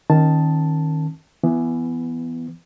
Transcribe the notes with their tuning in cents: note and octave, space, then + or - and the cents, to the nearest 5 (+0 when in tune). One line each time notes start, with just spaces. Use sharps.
D#3 +0 C#4 -30 A5 +0
E3 +20 B3 +0